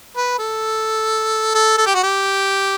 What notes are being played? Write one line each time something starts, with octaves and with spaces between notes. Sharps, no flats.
B4
A4
A4
A4
G4
F#4
G4